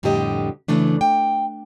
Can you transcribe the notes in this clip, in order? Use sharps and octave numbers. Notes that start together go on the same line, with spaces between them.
F2 A2 D3 G3 G4 D#5
C#3 E3 A3 D4
G5